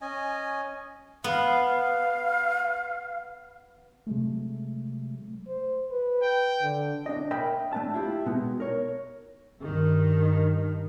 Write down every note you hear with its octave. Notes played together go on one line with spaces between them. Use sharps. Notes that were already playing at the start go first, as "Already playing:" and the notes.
C#4 D#5 G#5
B3 F5
C3 F#3 G#3 A3
C5
B4
G5
D3
D4 D#5
A#4 D#5 E5 G5 G#5 B5
A3 D4 A5
E4 F4 G4
B2 G#3 B3 D#4
A#4 C#5
G2 D#3